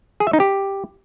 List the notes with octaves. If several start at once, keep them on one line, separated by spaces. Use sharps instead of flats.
G#4
E5
D#4
G4